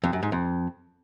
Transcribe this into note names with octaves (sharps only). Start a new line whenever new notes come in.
F2
F#2
G#2
F2